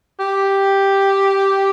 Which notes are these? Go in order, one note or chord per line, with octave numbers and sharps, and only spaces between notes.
G4